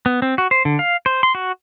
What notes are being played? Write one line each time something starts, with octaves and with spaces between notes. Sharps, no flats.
B3
C4
F#4
C5
D3
F5
C5
C6
F#4